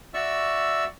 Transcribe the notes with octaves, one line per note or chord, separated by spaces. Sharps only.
F#4 D5 E5 C#6 E6